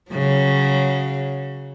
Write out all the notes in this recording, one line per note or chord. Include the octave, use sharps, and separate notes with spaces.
C#3 F#3